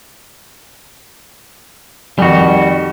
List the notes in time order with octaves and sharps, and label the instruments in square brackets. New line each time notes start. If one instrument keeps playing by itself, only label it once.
[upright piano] F2 D#3 [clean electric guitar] G3 F#4